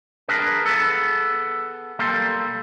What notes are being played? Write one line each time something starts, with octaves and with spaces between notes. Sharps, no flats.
D4 G#4 A#4 B4
B3 G#4 A4
B1 G3 A#3 A4 C6